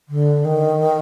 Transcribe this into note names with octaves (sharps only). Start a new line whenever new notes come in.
D3
D#3